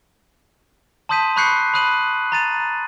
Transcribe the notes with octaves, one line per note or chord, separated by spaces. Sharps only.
A5 C6 D#6 G6 B6 D#7
B5 C#6 F#6 G6 C7 C#7
B5 D#6 F#6 D#7 F#7
A#5 A6 D#7